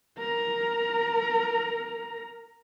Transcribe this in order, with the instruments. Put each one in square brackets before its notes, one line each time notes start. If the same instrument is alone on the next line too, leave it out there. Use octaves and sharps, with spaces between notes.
[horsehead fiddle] A#4 A#5